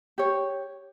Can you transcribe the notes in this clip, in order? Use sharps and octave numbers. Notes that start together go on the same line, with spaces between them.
G4 C#5